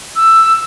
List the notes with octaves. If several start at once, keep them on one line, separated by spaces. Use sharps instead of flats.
E6